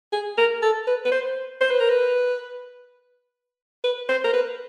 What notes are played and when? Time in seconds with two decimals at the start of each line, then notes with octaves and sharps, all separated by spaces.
0.13 G#4
0.38 A#4
0.62 A4
0.87 B4
1.05 B4
1.12 C5
1.61 C5
1.71 B4
1.80 A#4
1.89 B4
3.84 B4
4.09 C5
4.24 A#4
4.33 B4